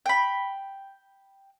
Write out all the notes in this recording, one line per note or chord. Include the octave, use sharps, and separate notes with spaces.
G5 B5